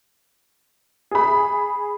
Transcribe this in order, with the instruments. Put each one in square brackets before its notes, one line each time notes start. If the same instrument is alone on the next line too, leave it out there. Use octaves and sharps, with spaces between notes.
[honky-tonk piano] G#4 B5